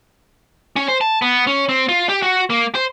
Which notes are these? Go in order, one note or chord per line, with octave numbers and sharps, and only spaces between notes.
C#4
C5
A5
B3
C#4
C4
F4
G4
F#4
A#3
C5